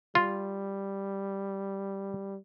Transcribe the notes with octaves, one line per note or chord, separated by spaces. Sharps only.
G3 F4